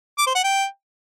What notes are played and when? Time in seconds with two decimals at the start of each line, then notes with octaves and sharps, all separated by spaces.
0.18 D6
0.27 C5
0.35 F#5
0.44 G5